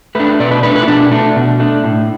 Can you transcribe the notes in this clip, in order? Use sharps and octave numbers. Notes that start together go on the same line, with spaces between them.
A3 D4 B4
B2 D5
B4
A3 D4 B4
B4
E4
B2 D4
A3 D4
B2
A3 D4
A2